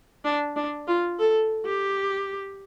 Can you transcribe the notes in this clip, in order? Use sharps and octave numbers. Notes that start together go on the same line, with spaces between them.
D4
D4
F4
A4
G4